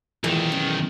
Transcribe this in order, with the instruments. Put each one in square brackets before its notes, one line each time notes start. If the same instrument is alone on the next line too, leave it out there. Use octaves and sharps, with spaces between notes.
[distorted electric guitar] B1 D#3 [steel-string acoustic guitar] A#2 E3 G#3
[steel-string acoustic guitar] C#3